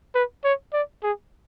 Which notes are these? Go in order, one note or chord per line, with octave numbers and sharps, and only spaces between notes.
B4
C#5
D5
G#4